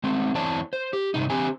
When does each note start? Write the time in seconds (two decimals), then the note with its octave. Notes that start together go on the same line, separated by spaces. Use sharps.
0.04 G#3 A3 C4
0.35 E2 C4 E4 C#5 D5 A5
0.73 C5
0.93 G4
1.14 G2 C3 D#4
1.30 D3 C4 G4 C5 G#5